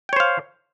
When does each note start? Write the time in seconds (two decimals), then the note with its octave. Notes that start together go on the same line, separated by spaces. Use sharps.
0.09 G5
0.13 C#5
0.16 C5
0.20 F5